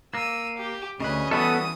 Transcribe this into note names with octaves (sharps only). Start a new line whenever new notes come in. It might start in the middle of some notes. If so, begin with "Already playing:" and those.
A#3 E6 D#7
G4
D2 C#3 C#4 B4 D#5
E3 G3 B3 F#4 A4 B4 D#6